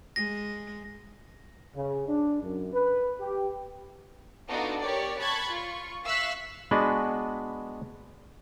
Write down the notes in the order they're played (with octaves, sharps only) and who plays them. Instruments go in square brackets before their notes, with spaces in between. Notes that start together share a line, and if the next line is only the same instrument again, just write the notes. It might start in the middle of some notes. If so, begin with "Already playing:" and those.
[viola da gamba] G#3 [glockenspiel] A#6
[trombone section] C#3
D4
F#2
B4
G4
[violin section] B3 D4 D#4 F4 F#4 A4
G4 A#4 C#5 D5
A5 B5 C#6 F#6 G#6 A6
F4 C#6
E5 F5 C#6 E6 F#6 B6
[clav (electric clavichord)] G#3 B3 D4 F#4 B4